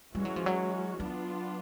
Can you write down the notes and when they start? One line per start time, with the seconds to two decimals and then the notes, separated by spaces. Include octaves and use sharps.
0.15 E3 G3 G#3 C#4 F#4
0.25 F#3
0.36 F3
0.46 F#3
1.00 F#3 B3 D4 F4